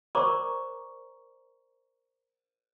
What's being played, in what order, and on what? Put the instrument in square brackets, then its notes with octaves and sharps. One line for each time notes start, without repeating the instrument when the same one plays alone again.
[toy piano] A#4 C5 D5 A#5 C#6 D6